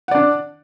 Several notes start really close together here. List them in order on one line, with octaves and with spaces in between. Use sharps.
F#5 D5 D4